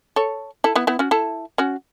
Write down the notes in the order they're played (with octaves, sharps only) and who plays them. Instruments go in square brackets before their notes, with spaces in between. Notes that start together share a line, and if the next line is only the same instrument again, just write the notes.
[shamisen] A4 C#5
E4 A4
B3 E4
B3 E4
C#4 F#4
E4 A4
C#4 F#4